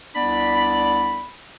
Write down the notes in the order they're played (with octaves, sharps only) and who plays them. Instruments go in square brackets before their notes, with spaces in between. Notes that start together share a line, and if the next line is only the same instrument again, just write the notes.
[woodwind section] C2 B3 D4 D5 B5